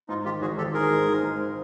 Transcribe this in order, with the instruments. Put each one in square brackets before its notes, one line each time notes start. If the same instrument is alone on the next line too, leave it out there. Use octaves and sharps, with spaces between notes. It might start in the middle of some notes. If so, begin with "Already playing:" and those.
[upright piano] G#2 [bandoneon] D#4 F4
[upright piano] D#3 [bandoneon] F4 G4
[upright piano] G#1 [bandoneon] F#4 G#4
[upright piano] G#1 [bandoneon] G4 A4
[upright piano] D#3 [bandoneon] G#4 A#4
[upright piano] G#2
D#3
G#2